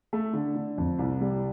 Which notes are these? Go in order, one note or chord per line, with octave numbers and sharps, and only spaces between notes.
A3
D3
D3
F2
C2
G3